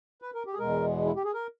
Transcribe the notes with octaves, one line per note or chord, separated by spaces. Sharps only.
B4
A#4
G4
G#4
E2 B2 G#3 A#4
E4
G4
G#4
A#4